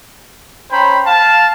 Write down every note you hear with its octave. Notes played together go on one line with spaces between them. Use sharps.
C#4 C5 G5 A#5 B5
F5 A5